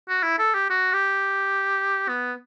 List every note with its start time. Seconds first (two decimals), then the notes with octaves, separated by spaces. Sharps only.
0.09 F#4
0.23 E4
0.39 A4
0.55 G4
0.70 F#4
0.93 G4
2.08 B3